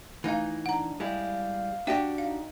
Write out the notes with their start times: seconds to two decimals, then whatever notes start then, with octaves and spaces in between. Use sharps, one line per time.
0.24 E3 A3 D#4 F5
0.66 D4 F#5 A#5
1.00 G3 G#3 E4 F5
1.87 D4 F#4 G4 E5 G5
2.18 D#4 F5